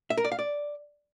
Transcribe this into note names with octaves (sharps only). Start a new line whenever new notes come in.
E5
A#4
D5
F5
D5